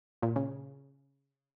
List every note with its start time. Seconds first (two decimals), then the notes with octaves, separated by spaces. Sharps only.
0.22 A#2
0.36 C#3